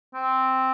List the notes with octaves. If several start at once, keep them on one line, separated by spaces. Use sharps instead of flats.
C4